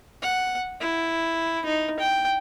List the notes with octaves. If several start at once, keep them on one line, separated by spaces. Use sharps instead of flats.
F#5
E4
D#4
G5